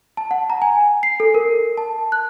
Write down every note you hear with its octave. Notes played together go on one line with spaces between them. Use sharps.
A5
F#5
A#5
G#5
C7
A4
A#4
A5
F#6